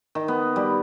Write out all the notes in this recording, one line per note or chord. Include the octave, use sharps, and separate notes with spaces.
D#3
B3
G3